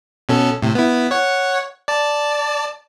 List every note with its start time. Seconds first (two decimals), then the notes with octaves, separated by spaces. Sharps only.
0.29 B2 C#4 A4
0.62 A2 C3
0.75 B3 E4
1.11 C#5 F#5
1.88 D5 A5